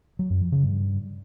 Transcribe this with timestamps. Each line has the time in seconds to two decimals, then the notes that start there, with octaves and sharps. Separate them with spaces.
0.19 F#3
0.30 F#2
0.41 F3
0.52 C#3
0.63 G2